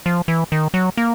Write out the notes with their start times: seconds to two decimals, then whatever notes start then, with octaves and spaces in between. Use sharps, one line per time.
0.06 F3
0.28 E3
0.52 D#3
0.74 F#3
0.97 A#3